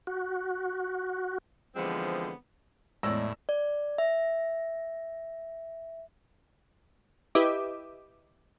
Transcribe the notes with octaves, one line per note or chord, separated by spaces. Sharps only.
F#4
D3 E3 F3 G#3 B3 C4
E2 A2 G#3 C#5 D5 E6 A#6
D5
E5
E4 G4 B4 D#5 E5 D6